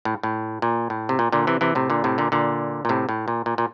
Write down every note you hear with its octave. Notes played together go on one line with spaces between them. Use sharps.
A2
A2
A#2
A2
C3
A#2
A#2 D3
C3 E3
C3 E3
A2 C3
A#2 D3
A2 C3
A#2 D3
A#2 D3
A#2
A2 C3
A2
A#2
A#2
A#2